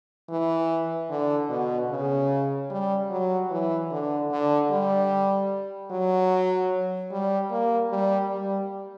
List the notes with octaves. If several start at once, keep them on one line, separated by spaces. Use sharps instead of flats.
E3
D3
B2
C#3
G3
F#3
E3
D3
D3
G3
F#3
G3
A#3
G3
G3